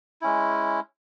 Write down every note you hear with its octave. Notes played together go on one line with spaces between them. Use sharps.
G#3 C#4 E4